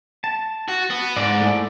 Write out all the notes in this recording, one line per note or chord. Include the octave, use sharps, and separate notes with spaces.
A5
F#4
B3
G#2 D5
A3 E4 D5